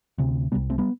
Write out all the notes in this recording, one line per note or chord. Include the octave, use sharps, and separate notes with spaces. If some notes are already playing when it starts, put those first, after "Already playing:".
D2 C3
C2 C3 G3 B3
A3 C4
G3 B3